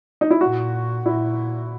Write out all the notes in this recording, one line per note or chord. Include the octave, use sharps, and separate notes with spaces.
D#4
E4
A#2 F#4
A#2 E4